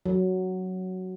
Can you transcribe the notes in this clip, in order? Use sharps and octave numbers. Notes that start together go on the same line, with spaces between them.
F#3